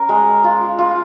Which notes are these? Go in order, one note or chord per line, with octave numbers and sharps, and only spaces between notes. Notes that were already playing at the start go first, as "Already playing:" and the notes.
Already playing: C#4 A#4
G#3
F4
F4